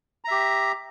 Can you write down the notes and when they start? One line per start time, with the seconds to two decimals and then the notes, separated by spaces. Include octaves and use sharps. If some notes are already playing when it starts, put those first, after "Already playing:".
0.24 A#5
0.28 E5
0.31 G4